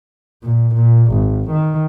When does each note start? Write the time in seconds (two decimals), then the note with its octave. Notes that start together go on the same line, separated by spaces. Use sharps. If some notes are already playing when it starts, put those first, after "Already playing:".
0.44 A#2
0.75 A#2
1.12 G#1
1.51 D#3